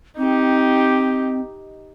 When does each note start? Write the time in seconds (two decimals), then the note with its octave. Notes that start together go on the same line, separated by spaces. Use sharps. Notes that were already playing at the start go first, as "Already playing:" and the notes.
0.18 C4 D#4 G4